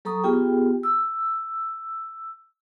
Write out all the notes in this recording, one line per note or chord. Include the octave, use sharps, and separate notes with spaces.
F#3 A4 A#5 C#6 D#6
B3 F4 G4 G#4 G5
E6